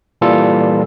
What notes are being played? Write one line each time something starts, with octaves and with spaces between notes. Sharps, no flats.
A#2 E3 G3 F4 A4